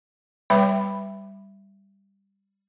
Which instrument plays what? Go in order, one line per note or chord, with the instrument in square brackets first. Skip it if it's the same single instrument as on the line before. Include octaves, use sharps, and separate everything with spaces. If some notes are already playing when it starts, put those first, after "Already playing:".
[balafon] G3 B4 E5 G5 B5